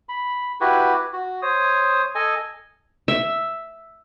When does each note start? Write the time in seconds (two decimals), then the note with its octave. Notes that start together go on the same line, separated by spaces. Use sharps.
0.09 B5
0.61 E4 F#4 G4 B4
1.13 F#4
1.42 C5 C#5 D#6
2.15 A4 D#5 G#5
3.08 E5